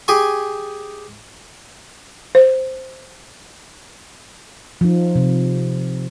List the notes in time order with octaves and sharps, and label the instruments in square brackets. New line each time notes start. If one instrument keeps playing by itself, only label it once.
[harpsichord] G4 G#4 G#5 C#6
[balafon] C5
[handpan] F3 D#4
C3